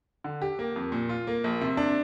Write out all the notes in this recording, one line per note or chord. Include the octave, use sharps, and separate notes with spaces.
D3
G4
A#3
F2
A#2
F4
A#3
A#1
C3
D4